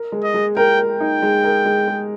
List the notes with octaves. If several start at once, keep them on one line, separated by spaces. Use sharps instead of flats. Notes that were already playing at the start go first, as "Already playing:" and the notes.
Already playing: A#4
G#3
D#5
G#3
A#4 G5
A#4
G5
D#4
G#3
A#4
G#3
G#3